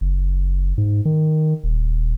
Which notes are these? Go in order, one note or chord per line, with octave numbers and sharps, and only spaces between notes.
F#1
G#2
D#3
D#1